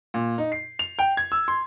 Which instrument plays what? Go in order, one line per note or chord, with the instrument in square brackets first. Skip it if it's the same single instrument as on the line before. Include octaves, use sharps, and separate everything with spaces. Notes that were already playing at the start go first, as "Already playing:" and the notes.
[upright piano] A#2
D#4
C7
F7
G5
G#6
E6
C6